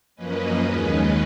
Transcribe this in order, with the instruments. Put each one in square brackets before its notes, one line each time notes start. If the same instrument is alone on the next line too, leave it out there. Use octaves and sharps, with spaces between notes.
[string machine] F#2 F3 A#3 C#4 B4 D#5
D#2 D#3 G#3 C#4